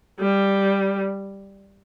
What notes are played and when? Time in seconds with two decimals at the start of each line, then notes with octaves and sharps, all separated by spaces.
0.20 G3